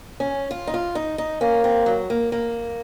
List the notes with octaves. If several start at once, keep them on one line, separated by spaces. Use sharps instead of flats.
C#4
F4
D#4
F4
D#4
D#4
A#3 C#4
C4
F#3
A#3
A#3